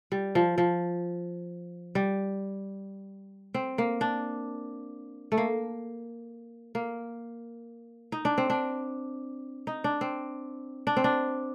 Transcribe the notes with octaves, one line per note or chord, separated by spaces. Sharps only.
G3
F3
F3
G3
C4
A#3
D4
A3
A#3
A#3
D#4
D4
C4
D4
D#4
D4
C4
D4
C4
D4